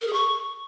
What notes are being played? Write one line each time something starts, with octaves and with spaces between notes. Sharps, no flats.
A#4
G#4
C#6